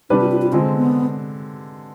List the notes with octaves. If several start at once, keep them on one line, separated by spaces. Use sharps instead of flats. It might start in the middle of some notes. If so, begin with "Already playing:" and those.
C3 G3 D4 D#4 G4 B4
F4
F4
F4
D3 G#3 C4 F4
B3